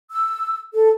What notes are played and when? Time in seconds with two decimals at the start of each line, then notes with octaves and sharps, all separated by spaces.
0.11 E6
0.74 A4